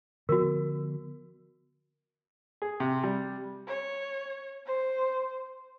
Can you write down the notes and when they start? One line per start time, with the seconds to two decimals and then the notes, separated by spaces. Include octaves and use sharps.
0.29 D3 F3 B3 F#4 A#4
2.62 G#4
2.80 C3
3.04 G3
3.68 C#5
4.66 C5